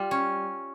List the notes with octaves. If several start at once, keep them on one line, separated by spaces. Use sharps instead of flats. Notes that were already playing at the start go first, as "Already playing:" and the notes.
Already playing: G3 F4
C#4